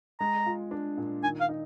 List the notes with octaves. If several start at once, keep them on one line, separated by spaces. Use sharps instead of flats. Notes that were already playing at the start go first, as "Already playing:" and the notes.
G#3 A#5
F4
D4
A#2
D#3 G#5
F5
D#4